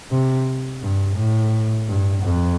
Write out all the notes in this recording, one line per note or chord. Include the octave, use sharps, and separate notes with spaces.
C3
G2
A2
G2
F2